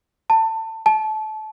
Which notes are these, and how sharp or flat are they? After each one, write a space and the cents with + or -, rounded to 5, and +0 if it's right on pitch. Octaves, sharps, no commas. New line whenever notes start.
A5 +25
A5 -25